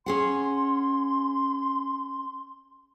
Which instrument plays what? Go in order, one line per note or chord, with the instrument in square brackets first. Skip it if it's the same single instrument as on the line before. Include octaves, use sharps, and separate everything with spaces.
[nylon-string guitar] C#4 G#4 F#5 [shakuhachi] C6